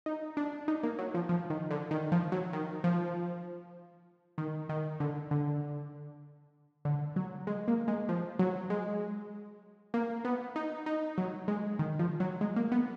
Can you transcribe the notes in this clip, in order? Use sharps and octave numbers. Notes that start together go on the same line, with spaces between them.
D#4
D4
D#4
A#3
F#3
F3
F3
D#3
D3
D#3
F3
F#3
D#3
F3
D#3
D#3
D3
D3
D3
F#3
G#3
A#3
G#3
F3
F#3
G#3
A#3
B3
D#4
D#4
F#3
G#3
D#3
F3
F#3
G#3
A#3
B3